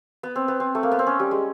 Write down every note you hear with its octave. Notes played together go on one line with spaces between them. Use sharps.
B3
C4
B3
C4
A3
A#3
B3
C4
C#4
G3
G#3